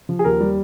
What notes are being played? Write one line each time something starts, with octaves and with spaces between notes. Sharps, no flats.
F3
G#4
D#2 A#4
G3